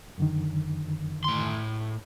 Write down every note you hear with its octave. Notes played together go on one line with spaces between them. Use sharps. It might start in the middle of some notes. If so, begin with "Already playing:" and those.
F#2 D3 D#3
A2 C6